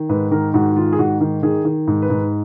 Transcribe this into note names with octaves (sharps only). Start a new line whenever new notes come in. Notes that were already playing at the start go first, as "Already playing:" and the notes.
Already playing: D#3
G#2 B4
D#3 A#4
G#2 F#4
F#4
D#3 F4
G#4
G#2 F#4
D#3
D#3 G#4
D#3
G#2
B4
G#2